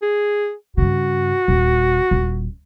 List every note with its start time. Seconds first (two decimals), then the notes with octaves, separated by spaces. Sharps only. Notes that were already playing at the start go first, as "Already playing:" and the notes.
0.02 G#4
0.77 G2 C#3 F#4
1.48 D#1
2.11 D#1